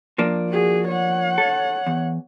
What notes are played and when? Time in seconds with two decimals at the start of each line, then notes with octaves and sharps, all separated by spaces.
0.18 F3 A#3 D4
0.49 F#4 G#4
0.88 C#5 F#5
1.38 A4
1.86 E2